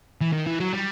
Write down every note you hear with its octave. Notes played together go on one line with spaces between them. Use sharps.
E3
D#3
E3
F#3
G3